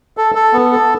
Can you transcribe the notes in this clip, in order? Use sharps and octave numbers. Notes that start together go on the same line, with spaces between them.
A4
A4
B3
A4